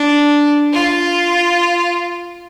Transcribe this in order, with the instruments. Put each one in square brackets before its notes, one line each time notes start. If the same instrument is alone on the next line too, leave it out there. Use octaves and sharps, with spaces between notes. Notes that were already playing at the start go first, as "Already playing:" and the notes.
Already playing: [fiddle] D4
F4